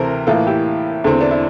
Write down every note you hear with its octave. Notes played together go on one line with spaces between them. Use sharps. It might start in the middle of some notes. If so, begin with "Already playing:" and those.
Already playing: D2 C3 E3 A4 A#4 C5
A2 E3 A#3 F4 A4
E4 G4
E2 D3 A3 C4
D4
E4